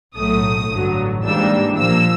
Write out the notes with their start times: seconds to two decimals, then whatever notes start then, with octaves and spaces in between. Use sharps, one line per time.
0.17 B1 A2 F#3 A3 D#6
0.70 A1 G2 D3 F#3
1.24 G#2 E3 G3 A#3 D4 E6
1.77 A#2 F3 A#3 E6